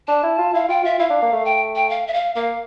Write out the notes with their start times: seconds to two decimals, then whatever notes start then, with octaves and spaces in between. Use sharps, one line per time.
0.08 D4 A5
0.24 E4
0.38 F4
0.53 E4 F5
0.69 F4 G5
0.84 F4 E5
0.99 E4 F5
1.10 D4
1.22 A#3
1.33 A3
1.45 G5
1.76 G5
1.90 F5
2.07 E5
2.13 F5
2.35 A#3 F5